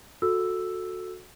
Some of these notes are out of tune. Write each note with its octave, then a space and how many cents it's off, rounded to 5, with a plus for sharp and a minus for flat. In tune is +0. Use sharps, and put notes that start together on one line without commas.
F#4 -20 A4 +0 E6 +0